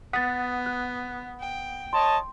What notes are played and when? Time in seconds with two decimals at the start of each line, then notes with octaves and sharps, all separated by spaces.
0.13 B3 F#5 D#6 A6 B6
0.66 F#6
1.40 G5
1.93 C#5 D#5 A5 C6